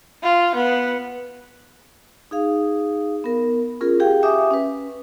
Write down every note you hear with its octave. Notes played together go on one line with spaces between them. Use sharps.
F4
B3
D#4 G#4 F5
B3 A#4
C#4 F4 G#4 A#4
G4 G#4 F5 G5
G4 E5 G#5 D6 D#6
C#4 B4